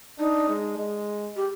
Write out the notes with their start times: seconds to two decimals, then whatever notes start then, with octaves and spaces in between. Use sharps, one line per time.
0.19 D4 D#4
0.49 G#3
0.77 G#3
1.36 G4